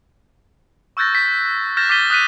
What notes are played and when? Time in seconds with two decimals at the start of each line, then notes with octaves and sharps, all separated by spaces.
0.97 C#6 E6 F#6 G6 A6 A#6
1.15 B6
1.77 F6 G6 A6 A#6 E7
1.89 D6 F6 A6 B6 D#7 G7
2.10 D#6 F#6 B6 D#7